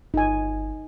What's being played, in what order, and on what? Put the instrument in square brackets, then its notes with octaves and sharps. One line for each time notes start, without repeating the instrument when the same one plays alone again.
[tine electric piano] G1 [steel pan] D#4 G#5